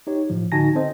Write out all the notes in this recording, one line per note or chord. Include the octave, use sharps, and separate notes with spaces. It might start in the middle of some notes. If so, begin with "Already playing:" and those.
D#4 G4 C#5
A2 F3
D3 D#4 F#4 G#5 A5 A#6
C4 A4 C5 D#5